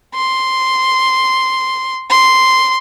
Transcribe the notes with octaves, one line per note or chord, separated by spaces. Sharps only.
C6
C6